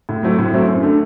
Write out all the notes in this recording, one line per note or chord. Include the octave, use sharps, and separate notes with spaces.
A2
F#3 A3 C4 E4
A2
F#3 A3 C4 E4
F#2
D3 A3 D4